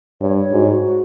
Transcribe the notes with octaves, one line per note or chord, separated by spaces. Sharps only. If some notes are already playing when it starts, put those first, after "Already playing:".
G2 C#5
C#5
G#2 F#4
F#4
F#4